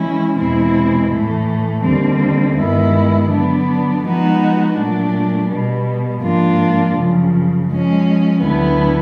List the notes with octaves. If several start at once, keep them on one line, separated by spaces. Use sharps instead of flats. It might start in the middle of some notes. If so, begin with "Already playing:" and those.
Already playing: E3 G#3 C#4 E4
E2 B2 G#3 C4 E4
A2 E3 A3
D#2 D3 G3 C4
G2 D#3 G#3 B3 E4
D3 F#3 B3 D4
F3 G#3 B3 D#4 F#4
A#2 F#3 A3 D4
B2 G3 B3
G#2 F3 A#3 D4 F4
F#2 C#3 F3
F3 G#3 C#4
D2 D3 F#3 B3 E4